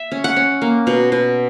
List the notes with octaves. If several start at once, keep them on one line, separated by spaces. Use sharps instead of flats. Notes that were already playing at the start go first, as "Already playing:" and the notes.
Already playing: E5
C#4
F#5
C#4
A#3
B2
B2